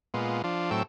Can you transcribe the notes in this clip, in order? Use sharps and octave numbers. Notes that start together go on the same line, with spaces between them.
A#2 G#3 B3 F4
F3 D4 F4
A2 F#3 C4 A4 G5 E6